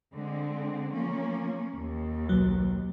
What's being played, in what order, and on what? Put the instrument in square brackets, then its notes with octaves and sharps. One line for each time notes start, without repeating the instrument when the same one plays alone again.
[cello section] D3 G#3 C4
F3 A#3 C#4
D#2
[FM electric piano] B1 F#3